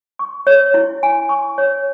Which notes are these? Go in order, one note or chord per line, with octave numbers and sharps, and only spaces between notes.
C#6
C#5
E4
G#5
C#6
C#5